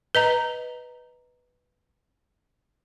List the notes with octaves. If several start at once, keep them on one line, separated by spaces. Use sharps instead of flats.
B4 D#5 A#5